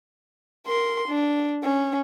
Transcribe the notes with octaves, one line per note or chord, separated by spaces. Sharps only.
A#4 C6
D4
C#4